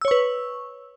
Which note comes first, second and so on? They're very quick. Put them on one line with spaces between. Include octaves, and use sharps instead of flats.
E6 C#5 C#6 B4